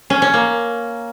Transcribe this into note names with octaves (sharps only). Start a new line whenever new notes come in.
C#4
C#4
A#3